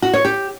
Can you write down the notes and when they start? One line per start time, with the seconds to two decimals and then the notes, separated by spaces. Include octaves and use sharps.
0.02 F#4
0.14 C#5
0.25 G4